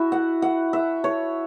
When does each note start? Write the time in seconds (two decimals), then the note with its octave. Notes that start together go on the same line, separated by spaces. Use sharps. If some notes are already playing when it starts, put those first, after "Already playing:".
Already playing: E4 F#4 E5
0.12 F#5
0.42 F#5
0.73 E5
1.04 C#5